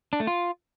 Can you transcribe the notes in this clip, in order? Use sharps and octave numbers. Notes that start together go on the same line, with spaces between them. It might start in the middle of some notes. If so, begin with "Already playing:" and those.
D4
A3
F4